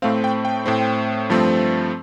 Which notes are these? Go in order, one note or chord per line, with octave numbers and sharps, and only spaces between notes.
A2 A3 C4 F5
G5
G5
A2 A3 C4
G2 F3 A3 C4